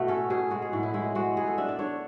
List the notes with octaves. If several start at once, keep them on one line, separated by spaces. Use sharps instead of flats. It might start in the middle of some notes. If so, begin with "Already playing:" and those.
Already playing: B2 A3 E4 F#4
C#4 A4
B2 G#4
G#3 F#4
G#4
A2 F#4
E4
G#3 E4
G#3 F#4
B3 G#4
A4
D4 E5
D5
D4 C#5